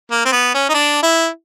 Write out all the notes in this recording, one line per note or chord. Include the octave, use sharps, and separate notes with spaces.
A#3
C4
B3
C#4
D#4
D4
E4